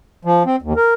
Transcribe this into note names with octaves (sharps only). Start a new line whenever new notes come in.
F3
C4
D#2
A#4